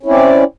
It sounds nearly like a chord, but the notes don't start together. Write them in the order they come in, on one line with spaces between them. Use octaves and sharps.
C#4 E4 C4 D5